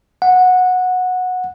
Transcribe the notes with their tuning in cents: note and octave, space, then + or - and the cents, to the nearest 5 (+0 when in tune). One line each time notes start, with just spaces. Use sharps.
F#5 -15